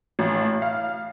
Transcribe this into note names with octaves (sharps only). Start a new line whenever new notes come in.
A1
F5